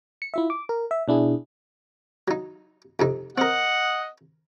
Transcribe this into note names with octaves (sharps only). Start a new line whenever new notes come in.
C#7
E4 F4 E5
D6
A#4
E5
B2 D4 E4 G#4
F#3 D#4
F2 C3 D#4
C4 A#4 D#5 F#5